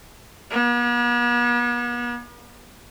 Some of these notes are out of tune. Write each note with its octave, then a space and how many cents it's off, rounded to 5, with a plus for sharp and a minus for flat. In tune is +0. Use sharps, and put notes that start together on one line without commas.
B3 -45